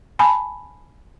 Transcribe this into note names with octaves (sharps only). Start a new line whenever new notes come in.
G#5 A5 B5